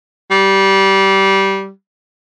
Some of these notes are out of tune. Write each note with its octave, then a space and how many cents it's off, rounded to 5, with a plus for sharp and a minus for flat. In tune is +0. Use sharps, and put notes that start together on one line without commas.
G3 -15